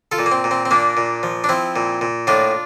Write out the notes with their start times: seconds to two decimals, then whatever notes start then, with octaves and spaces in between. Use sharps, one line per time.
0.12 F4 A4
0.19 A#2
0.26 A#3
0.31 C4
0.44 A#2
0.51 C4
0.65 C4
0.71 A#2 A#3 D4
0.97 A#2
1.23 F3
1.44 D4
1.49 F3 C4 E4
1.76 A#2
2.01 A#2
2.27 A2 D4 F4